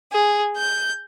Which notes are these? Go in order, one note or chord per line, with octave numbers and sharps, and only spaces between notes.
G#4
G6